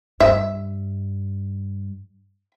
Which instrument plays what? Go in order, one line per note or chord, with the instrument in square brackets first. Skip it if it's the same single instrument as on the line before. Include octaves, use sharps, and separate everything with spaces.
[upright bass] G2 [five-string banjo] E5